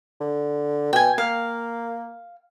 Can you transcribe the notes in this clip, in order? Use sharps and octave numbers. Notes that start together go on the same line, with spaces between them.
D3
B2 G5 G#5
A#3 F5